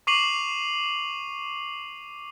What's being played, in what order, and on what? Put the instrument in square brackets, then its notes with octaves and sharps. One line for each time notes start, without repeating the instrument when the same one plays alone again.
[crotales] C#6 D6 C7 D#7 F7 F#7